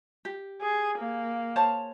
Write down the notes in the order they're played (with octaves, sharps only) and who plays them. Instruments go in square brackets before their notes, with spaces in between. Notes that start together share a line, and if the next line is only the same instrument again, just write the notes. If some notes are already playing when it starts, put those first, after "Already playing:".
[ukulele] G4
[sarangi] G#4
A#3
[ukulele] C5 C#5 A5